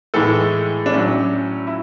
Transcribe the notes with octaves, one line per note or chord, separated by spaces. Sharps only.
A2 E3 G#3 A4
D4
A2 F#3 C#4
E4